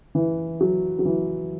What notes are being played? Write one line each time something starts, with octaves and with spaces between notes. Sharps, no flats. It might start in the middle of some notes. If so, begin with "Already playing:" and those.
E3
F#3
F#3
E3